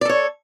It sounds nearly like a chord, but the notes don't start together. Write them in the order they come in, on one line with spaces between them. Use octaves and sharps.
D5 A4 C#5